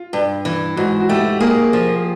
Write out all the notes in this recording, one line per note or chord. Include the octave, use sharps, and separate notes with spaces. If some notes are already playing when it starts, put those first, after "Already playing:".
Already playing: F4
G2
E3
G#2 F#4
F#4
A3 G4
A#3 G#4
F3